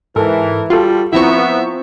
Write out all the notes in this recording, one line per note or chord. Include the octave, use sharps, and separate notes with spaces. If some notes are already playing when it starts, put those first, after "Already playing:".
G#2 E3 A4 A#4
G3 F4 F#4 A4
F3 B3 C4 E4 E5 A#5 C#6